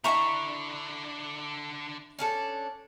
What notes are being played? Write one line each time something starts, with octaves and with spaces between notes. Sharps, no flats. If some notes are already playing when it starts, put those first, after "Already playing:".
D3 D4 E4 E5 G#5 A#5 C#6
C#4 D4 A4